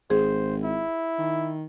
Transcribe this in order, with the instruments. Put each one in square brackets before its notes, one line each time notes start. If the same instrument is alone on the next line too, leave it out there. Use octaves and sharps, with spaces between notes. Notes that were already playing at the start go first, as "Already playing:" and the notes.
[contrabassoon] G#1 [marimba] G#4 [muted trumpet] C5
[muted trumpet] E4
[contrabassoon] D#3